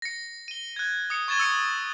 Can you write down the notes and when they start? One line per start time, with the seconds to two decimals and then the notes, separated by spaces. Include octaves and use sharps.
0.02 A#6 C#7
0.48 D#7 G7
0.76 F#6 G#6
1.10 D#6 C#7
1.28 C#6 G#6 A6 E7 G7
1.39 E6 C#7 D#7